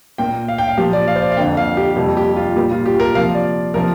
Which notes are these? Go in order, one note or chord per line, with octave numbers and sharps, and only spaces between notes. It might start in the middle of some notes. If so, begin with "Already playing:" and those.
A#2 A#3 G5
F5
G5
F5
A#2 F3 A#3 G4
D5
F5
C5
D5
F5
F2 D3 A#3 G5
F5
G4
F2 C3 G3 A#3
G4
F4
A#2 G3 A#3 G4
F4
G4
A#4
C3 F3 A#3 F5
D5
C3 F3 A#3 A#4